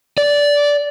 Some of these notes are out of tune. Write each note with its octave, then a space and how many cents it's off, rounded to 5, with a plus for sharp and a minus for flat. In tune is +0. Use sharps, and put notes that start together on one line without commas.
D5 -15